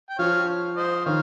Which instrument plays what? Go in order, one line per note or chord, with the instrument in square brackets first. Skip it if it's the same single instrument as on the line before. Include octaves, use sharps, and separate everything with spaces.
[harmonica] G5
[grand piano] F3 [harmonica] C#5 F5
[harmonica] C5 D#5
[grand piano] D#3 [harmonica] C#5 F5